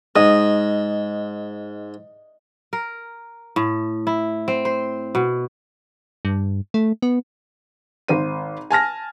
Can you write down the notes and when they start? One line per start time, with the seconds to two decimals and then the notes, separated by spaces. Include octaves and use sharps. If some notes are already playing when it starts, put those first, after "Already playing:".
0.16 G#2 D#5
2.73 A#4
3.56 A2
4.07 E4
4.48 C4
4.65 C5
5.15 B2
6.25 G2
6.74 A3
7.02 B3
8.08 G#1 C5 D#7
8.70 G#5 A5 F6 A#6